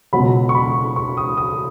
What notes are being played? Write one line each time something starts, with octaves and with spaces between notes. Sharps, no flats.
C#2 B2 F#3 B5
C#6
B5
C#6
D#6
D#6